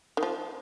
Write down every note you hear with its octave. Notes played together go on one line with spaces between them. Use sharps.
D#3
F3